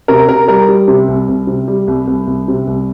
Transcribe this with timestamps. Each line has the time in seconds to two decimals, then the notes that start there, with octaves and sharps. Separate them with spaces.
0.08 C3 A#4
0.28 C3 A#4
0.48 G3 A#4
0.69 G3
0.88 C3
1.08 C2
1.28 C2
1.47 C3
1.68 G3
1.87 C2
2.07 C2
2.27 C2
2.48 C3
2.67 C2